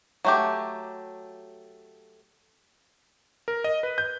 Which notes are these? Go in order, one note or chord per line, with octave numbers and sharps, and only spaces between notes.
F#3 A3 G4
A#4
D#5
B4
G6